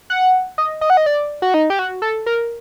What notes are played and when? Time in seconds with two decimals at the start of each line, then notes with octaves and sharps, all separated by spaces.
0.10 F#5
0.58 D#5
0.81 D#5
0.90 F#5
0.97 D#5
1.06 D5
1.42 F#4
1.54 D#4
1.70 G4
1.79 F#4
2.02 A4
2.26 A#4